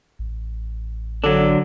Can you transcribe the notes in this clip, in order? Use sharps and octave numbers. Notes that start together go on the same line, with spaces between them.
A1
D3 F#3 D4 A4